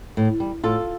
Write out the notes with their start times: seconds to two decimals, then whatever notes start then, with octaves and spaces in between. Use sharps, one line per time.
0.17 A2
0.40 G3
0.64 A2 F4 A4